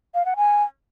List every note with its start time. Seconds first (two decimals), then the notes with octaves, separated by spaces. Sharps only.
0.15 F5
0.26 F#5
0.37 G#5